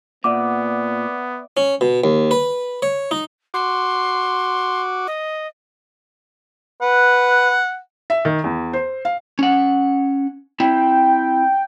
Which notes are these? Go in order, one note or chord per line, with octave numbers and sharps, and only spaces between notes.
A#2 B3 D5 E5 F#5 D6
C#4
B2
D#2
B4
C#5
D#4
F#4 C6 D6
D#5
B4 F#5
E5
D#3
E2
C5
F5
C#4 F#5
C4 E4 G5